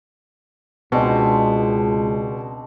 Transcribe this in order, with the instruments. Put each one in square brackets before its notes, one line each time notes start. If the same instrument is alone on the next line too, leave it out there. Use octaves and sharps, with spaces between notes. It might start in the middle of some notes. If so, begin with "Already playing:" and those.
[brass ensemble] C#2 [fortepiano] B2 [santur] G#3 C4 D4